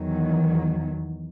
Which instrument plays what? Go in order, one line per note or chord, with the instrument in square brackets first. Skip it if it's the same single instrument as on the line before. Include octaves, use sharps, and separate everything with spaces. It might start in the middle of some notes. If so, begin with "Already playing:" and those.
Already playing: [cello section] E2 D#3 F#3